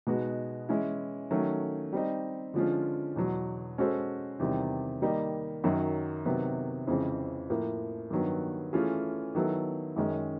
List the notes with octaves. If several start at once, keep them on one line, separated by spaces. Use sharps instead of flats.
B2 G#3 B3 D#4 F#4
E3 G#3 C#4 E4
D#3 F#3 A3 C#4
G3 C4 D#4
D3 F3 G#3 C#4 F4
E2 B2 F#3
G#3 C#4 F#4 A4 C5
E2 C3 D#3 G3
D#3 G3 A#3 D#4
F#2 D#3 F#3
C3 D#3 F#3 B3
F2 C#3 E3 G#3 C4
A2 F3 A#3
G2 D#3 F#3 B3
E3 A3 C#4 F4 G#4
D#3 F#3 B3 E4 A4
F#2 D#3 G#3 C#4